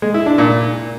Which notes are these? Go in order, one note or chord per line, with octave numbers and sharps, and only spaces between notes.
G#3
E4
D4
A#2